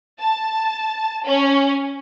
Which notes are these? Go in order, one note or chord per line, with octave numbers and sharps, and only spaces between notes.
A5
C#4